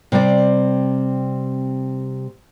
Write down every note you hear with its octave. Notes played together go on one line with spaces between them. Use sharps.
C3 G3 C4 D5